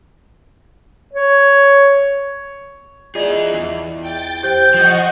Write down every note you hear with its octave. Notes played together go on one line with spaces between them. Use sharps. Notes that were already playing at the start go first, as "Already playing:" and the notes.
C#5
E4 F4 G#4 D5 D#5
E2
G5 A6
G4 C5 G6
F3 D#5 F#5 C#6